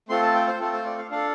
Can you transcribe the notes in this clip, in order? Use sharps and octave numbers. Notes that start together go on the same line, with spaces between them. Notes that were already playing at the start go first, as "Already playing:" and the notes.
A3 C4 F4 A4 C6
A5
G5
C5
A3 C4 F4 A4
C5
D5
F5
D4 A4 F5